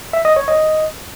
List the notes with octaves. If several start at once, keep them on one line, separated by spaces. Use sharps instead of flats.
E5
D#5
C#5
D#5